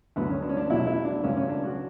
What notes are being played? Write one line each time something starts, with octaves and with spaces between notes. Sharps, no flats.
D2 D3 F#3 B3
C#4
D4
C#4
D4
E2 B2 F#3 E4
E4
D4
C#2 C#3 F#3 C#4
C#4
D4
F#4